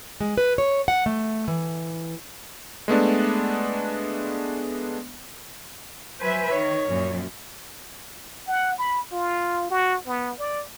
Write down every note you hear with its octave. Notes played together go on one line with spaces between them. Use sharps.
G#3
B4
C#5
F#5
A3
E3
G#3 A3 B3 D4
F#3 B4 C5 E5 G#5
D#3 C#5
F#2 A#2
F#5
B5
F4
F#4
B3
D5